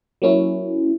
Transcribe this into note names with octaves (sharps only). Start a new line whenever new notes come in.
F#3 A#3 C#4 E4